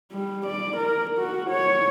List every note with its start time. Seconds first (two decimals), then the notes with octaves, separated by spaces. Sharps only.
0.12 G3
0.46 D5
0.77 A#4
1.19 F#4
1.50 C#5